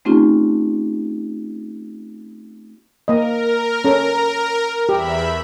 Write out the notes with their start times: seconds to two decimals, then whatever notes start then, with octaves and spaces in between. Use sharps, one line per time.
0.05 A3 C4 C#4 D#4 F4 G4
3.08 A#3 A#4 D#5
3.84 C#4 A4
4.89 E2 G4 E5 B5